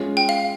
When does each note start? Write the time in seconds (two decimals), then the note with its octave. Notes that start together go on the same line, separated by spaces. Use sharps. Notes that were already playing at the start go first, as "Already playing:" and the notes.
Already playing: G#3 C#4 F4
0.17 G5
0.29 F5